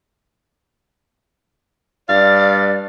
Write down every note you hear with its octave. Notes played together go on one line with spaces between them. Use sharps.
G2 D5 F5 A6